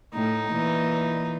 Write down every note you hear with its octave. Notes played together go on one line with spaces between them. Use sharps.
A2 D#4
A#2 E3